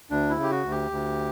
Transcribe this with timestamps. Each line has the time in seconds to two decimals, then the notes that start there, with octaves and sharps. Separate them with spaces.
0.11 D2 D4
0.30 E4
0.37 C#3
0.43 G4
0.51 F#4
0.64 D2
0.71 G4
0.91 D2